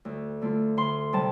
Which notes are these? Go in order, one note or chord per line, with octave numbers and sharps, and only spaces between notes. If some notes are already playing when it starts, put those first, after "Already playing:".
D2
D3 A3 F4
D2 C6
C3 G3 A5